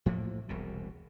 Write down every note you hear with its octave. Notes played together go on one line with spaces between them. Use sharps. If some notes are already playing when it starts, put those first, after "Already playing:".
A2 F3 A3 A#3
E1 C2 B2